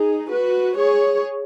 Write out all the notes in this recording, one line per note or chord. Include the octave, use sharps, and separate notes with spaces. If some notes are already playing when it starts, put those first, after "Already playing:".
Already playing: D#4 G#4
F#4 B4
G#4 C#5